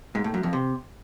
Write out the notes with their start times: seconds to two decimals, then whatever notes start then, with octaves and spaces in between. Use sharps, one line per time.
0.15 G#2
0.24 A2
0.34 F#2
0.43 F2
0.53 C3